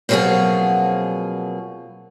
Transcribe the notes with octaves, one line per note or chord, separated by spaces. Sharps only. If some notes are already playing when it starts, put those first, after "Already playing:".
B2 F3 F#3 A#3 C4 G#4